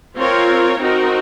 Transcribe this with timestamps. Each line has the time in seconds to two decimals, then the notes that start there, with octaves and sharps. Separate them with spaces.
0.18 C4 F4 A#4 C#5
0.79 C4 D#4 F#4 A#4